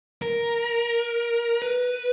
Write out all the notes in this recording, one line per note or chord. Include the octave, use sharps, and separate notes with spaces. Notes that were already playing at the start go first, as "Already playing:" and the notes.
A#4
B4